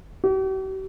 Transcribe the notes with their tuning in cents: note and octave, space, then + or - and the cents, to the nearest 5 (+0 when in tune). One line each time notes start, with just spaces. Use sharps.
G4 -45